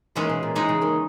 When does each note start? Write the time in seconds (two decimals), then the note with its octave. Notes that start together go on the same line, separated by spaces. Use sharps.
0.15 D#2 D#3 E3 G#3 C#4 G#4
0.29 B2
0.43 A#2
0.55 E3 G#3 D#4 G#4
0.69 C#3
0.81 D#2 D#3